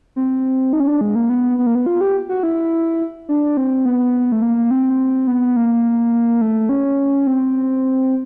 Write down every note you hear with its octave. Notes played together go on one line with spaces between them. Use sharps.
C4
D#4
C#4
D4
G#3
A#3
B3
B3
A#3
B3
F4
G4
F#4
E4
D4
C4
B3
A3
A#3
C4
B3
A#3
A3
C#4
C4